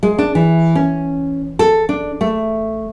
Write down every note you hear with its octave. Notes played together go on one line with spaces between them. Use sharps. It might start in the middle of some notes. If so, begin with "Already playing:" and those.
G#3
D4
E3
C#4
A4
D4
A3